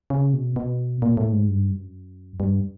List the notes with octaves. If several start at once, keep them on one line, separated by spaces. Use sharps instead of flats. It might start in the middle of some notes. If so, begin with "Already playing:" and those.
C#3
B2
B2
A#2
A2
G#2
G2
F#2
G2